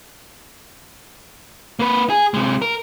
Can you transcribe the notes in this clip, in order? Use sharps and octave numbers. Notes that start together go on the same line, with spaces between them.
A#3 B4
G#4
C3 G#3
A#4